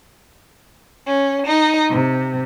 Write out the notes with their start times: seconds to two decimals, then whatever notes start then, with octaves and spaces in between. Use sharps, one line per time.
1.05 C#4
1.46 D#4
1.90 C3